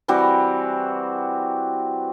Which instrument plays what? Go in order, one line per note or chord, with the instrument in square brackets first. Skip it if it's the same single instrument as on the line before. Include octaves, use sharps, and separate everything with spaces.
[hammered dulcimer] E3 G3 C4 F#4